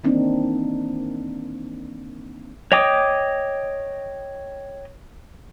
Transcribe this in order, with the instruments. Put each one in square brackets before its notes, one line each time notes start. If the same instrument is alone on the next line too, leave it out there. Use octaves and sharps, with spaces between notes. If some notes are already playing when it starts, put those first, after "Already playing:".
[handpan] D#3 E3 A#3 C4 D4 D#4
[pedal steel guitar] C#5 D#5 G5 D6 D#6